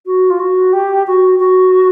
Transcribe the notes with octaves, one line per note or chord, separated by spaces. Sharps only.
F#4
F4
F#4
G4
F#4
F#4